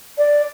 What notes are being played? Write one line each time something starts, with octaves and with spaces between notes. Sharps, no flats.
D5